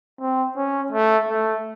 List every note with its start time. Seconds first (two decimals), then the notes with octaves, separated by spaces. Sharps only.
0.20 C4
0.56 C#4
0.92 A3
1.29 A3